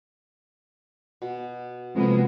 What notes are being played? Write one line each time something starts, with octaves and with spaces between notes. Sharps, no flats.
B2
F2 C3 G#3 A#3 B3